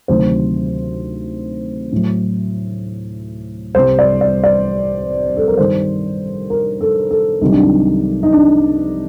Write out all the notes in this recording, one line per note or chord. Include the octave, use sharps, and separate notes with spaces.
D2 C3 D#3 F#3 C5
A2 F#3
C2 C3 G3 C5
D5
D5
D5
A4
A#4
G2 D#3 G3 C5
A#4
A4
A4
C2 C3 D#3 F#3 D#4
D4
D#4
D#4
D4